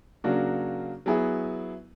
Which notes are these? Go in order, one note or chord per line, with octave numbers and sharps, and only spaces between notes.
C#3 F#3 A#3 D4 F#4
F#3 B3 E4 G#4